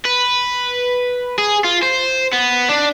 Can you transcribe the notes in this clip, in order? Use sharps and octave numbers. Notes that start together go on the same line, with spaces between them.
B4
G#4
F4
C5
B3
D4